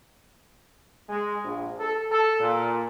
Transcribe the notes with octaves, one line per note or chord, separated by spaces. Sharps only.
G#3
A#1
A4
A4
A#2